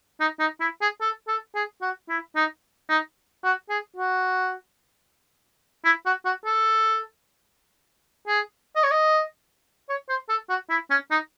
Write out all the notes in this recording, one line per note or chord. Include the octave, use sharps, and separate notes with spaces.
D#4
D#4
E4
G#4
A4
A4
G#4
F#4
E4
D#4
D#4
F#4
G#4
F#4
E4
F#4
F#4
A4
G#4
D#5
C#5
D#5
C#5
C5
A4
F#4
E4
C#4
D#4